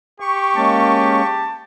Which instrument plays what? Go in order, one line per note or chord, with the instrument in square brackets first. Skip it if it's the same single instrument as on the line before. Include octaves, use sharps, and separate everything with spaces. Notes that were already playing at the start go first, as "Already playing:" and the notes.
[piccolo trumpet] G4 [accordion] C#6
[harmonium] G#3 A#3 C#4 [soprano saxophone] A5